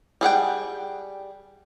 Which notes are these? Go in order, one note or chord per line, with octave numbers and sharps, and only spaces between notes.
G3 G#4 F#5 G5